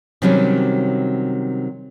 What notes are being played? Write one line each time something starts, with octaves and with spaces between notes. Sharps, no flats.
C3 D#3 F#3 G3 C#4